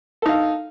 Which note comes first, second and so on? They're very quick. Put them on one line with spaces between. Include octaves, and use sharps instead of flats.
A4 D#4 F5